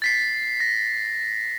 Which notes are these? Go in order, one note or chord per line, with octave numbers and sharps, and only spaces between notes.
A6 B6 C7
A#6